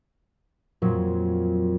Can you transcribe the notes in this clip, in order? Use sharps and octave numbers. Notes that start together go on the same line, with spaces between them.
F2 A#2 F#3